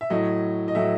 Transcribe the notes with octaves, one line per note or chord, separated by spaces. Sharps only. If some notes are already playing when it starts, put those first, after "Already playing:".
E5
A2 F#3 A3 D#5
D#5
A2 F#3 A3 E5